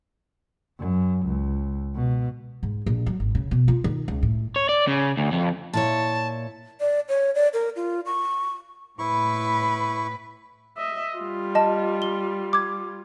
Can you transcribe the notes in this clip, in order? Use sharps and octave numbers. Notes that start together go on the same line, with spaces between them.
F#2
C#2
B2
G#2
A#1
F#3
G#1
C#3
B2
F4
D#3
C#2
A2
C#5
D5
C#3
D2
F2
A#2 E4 C#5 A5
D5
C#5
D5
A#4
F4
C#6
A2 E4 B4 C#6
D#5 E5
G3 F4
D#5 A5
G7
D6 G#6